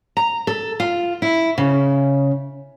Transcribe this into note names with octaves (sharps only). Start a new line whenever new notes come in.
A#5
A4
F4
E4
C#3